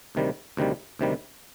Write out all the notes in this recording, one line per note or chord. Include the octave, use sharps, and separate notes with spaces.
D2 C3 D#3 G3
D2 C3 D#3 G3
D2 C3 D#3 G3